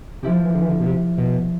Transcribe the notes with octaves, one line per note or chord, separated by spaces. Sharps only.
C3 F3 A3 E4 G4
E3
D3
E3
D3
B2
C3
B2